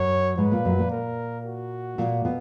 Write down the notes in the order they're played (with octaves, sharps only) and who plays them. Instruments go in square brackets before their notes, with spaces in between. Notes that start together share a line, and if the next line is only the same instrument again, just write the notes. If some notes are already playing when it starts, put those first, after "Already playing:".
Already playing: [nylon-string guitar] F#2 F#3 [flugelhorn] C#5
[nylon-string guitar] G#2 G#3 [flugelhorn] B4
[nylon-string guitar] A#2 A#3
F#2 F#3
A#2 A#3
[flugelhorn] A#4
F#4
[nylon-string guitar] A#2 A#3
B2 B3